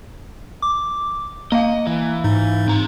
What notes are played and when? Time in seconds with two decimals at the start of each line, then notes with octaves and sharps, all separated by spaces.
0.62 D6
1.52 A#3 D#5 F5 A#5
1.87 E3
2.24 G#2 D#4
2.68 C4 A#5